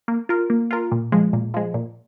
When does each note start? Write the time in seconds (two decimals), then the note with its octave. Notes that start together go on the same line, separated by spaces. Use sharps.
0.08 A#3
0.29 F4 A#4
0.50 A#3
0.71 F4 A#4
0.92 A#2
1.12 F3 G#3
1.33 A#2
1.54 F3 G#3
1.74 A#2